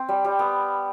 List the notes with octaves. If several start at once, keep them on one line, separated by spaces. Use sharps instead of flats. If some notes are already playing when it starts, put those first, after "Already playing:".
Already playing: C4
G3
G3
B3